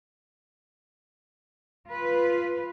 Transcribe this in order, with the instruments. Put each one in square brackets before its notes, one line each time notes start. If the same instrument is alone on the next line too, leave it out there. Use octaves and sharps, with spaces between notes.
[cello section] F4 B4